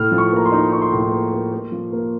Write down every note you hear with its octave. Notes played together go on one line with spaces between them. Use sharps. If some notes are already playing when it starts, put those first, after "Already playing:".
Already playing: A2 F6
F3
C#6
A#3 A#5
C6
D#4
D#4 C#6
C6
A2 A#5
C6
A#3
A#3
A#3
F3
A#3